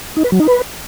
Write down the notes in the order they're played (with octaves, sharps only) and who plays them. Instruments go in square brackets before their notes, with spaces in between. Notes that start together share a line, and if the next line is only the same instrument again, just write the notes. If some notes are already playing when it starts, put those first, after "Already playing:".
[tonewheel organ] D#4
B4
F#3
D#4
B4